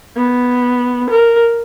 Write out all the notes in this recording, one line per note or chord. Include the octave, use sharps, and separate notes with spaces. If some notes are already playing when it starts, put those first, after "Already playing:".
B3
A#4